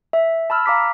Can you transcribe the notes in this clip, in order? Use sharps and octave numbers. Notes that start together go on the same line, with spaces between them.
E5
A5 B5 E6 F6
F5 A#5 D6 B6